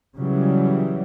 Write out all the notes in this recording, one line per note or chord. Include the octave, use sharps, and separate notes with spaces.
C#3 E3 F#3 G3